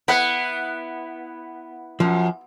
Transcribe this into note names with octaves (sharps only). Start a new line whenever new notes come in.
B3 E4 F#5
F#2 F3